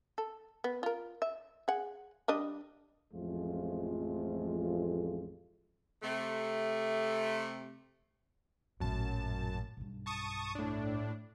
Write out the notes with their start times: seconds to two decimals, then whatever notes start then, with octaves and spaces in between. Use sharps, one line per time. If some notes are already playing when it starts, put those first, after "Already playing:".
0.18 A4
0.64 B3
0.83 F4 A#4
1.22 E5
1.68 G#4 F#5
2.28 G3 D4 D#5
3.13 A1 F2 F3 G#3 A3 F4
6.02 C3 A3
8.80 A1 F#2 A#2 A5
9.77 B1 G2
10.06 A5 C#6 D#6
10.55 A2 D4